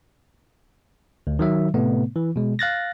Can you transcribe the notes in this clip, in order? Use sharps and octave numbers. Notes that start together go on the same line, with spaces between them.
D2
D#3 F#3 E5
A2 C3 A3 B3
E3
B2 G#3
F5 F#6 A6 A#6